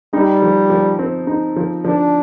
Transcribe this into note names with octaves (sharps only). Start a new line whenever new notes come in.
G3 D#4
F3
F3
C4
D#4
F3
F3 D4